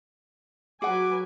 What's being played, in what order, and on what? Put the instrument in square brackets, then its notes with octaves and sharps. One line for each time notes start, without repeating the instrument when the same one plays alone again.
[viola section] F#3 B4 G#5 [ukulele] G#4 F#5 [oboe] D6